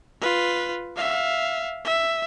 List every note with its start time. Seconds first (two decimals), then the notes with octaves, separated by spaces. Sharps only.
0.21 F4 B4
0.96 E5 F5
1.85 E5